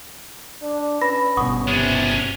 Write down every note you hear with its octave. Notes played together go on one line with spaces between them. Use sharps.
D4
C#4 B4 B5 A#6
G1 B2 F#5 C#6 D#6
C3 C#4 D4